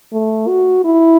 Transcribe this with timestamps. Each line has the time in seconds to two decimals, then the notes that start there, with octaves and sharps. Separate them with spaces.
0.13 A3
0.48 F#4
0.85 E4